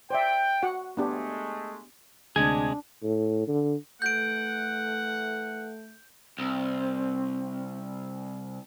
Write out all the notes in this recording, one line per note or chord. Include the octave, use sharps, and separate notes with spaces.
C5 D5 E5 G5
F#4 F#5
G#3 A3 B3 D4 G4
D2 C3 G#3 D4 G#4 D#6 G#6
A2
D3
E3 A3 F#5 G6 D7
C2 C4